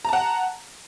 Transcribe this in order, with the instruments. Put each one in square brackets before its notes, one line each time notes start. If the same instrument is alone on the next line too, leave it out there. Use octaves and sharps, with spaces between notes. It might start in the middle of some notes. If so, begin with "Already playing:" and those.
[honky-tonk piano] A#5
A5
F#5